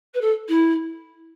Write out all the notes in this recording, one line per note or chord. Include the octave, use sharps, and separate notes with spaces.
B4
A4
E4